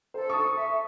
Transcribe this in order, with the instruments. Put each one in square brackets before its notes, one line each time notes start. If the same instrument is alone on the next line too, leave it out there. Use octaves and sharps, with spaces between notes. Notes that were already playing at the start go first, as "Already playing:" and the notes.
[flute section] A4 [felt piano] C5
[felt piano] C#6 D#6
[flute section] E5